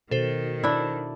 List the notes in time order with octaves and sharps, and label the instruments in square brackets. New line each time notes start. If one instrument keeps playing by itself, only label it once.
[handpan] B2 [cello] D#3 [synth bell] A4 C5
[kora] D4 E4